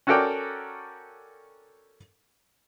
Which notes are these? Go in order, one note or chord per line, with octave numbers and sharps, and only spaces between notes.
C#4 F#4 A4 A#4 D5 G5